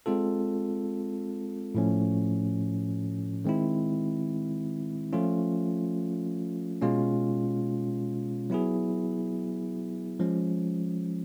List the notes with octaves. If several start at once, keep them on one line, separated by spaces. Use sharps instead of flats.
G#3 C4 F4 A4
A2 F3 A3 C#4
D#3 G#3 C4 E4
F3 A3 C#4 F4
B2 G#3 C#4 F4
F#3 B3 E4 G#4
F3 G#3 C#4